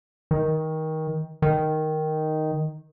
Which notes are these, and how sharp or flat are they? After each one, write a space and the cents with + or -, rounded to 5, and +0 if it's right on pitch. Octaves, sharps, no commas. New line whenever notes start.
D#3 +20
D#3 +0